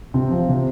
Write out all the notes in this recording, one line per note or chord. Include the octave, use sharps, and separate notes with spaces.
C3 C4
F3
C3